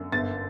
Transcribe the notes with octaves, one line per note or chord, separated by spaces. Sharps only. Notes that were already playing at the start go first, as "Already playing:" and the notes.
Already playing: F#2 D3
G1 A6